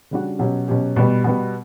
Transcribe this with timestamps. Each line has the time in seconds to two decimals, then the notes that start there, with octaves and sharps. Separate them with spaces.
0.11 C#3 G3 D4 F#4
0.39 B2 F#3 C#4 G4
0.68 B2 F#3 C#4 G4
0.96 B2 G3 B3
1.24 B2 G3 B3